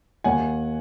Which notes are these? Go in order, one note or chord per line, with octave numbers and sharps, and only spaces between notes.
D#2 F#5 G#5